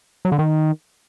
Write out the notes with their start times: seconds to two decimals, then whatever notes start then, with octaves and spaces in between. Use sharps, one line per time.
0.25 F#3
0.32 D3
0.39 D#3